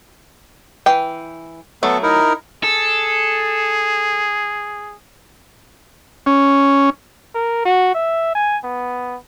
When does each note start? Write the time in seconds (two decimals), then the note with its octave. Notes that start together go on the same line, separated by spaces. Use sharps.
0.86 E3 G5
1.83 F#3 A3 B3 A4
2.03 D#4 E4 A#4
2.64 G#4 A4
6.26 C#4
7.35 A#4
7.65 F#4
7.94 E5
8.35 G#5
8.63 B3